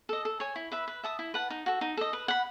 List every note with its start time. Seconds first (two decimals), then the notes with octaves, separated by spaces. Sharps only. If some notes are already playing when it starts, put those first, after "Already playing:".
0.09 A4 D#5
0.25 A4
0.40 C#5 G#5
0.56 E4
0.72 B4 E5 B5
0.88 B4
1.03 E5 A5 D#6
1.19 E4
1.34 B4 F#5 A5
1.50 D#4
1.66 F#4 A4
1.81 D#4
1.97 A4 D#5
2.13 B4
2.28 F#5 B5